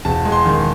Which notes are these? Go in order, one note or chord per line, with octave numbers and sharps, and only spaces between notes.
E1 A5
G#3
C6
D#3